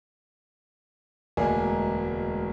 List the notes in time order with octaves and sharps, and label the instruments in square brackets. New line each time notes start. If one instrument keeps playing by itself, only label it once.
[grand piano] E1 D2 G#3 A#3 G#5